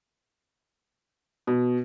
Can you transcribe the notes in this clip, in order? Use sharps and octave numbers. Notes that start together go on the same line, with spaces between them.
B2